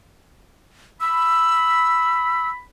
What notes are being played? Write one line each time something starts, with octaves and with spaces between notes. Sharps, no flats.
B5 E6